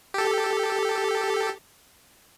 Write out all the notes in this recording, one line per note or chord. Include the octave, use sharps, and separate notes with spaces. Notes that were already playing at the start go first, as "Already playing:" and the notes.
G4 A4